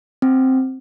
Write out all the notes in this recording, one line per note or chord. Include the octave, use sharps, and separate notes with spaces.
C4